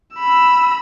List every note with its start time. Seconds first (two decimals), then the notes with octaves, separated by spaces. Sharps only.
0.14 B5 E6